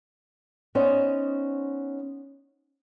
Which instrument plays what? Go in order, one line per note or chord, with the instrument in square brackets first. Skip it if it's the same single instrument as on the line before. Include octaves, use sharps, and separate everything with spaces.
[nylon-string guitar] B3 C#4 D#4 C5 D5 D#5